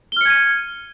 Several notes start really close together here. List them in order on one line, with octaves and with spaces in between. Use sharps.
G7 F6 C#7 G#6 D#7